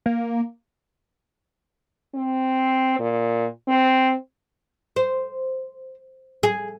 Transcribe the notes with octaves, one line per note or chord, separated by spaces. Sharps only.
A#3
C4
A#2
C4
C5
G#4